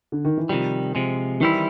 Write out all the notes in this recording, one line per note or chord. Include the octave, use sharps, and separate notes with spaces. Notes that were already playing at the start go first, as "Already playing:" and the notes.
D3
D#3
E3
C3 D#3 F3 G3
C3 F3 G#3
D#3 E3 G3 C4 E4